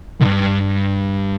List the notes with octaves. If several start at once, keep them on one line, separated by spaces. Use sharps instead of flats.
C2 G2